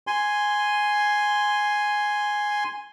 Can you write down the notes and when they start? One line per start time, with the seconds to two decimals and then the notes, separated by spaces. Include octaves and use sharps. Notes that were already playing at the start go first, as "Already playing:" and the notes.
0.07 G#5 C6